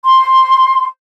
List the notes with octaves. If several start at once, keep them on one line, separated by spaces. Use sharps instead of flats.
C6